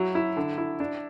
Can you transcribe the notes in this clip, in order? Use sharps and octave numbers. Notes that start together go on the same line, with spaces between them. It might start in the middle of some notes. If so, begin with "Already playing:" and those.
Already playing: F#3 E4
E4
D3
E4
D4